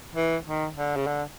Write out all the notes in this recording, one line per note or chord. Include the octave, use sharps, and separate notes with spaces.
E3
D#3
D3
C#3
D3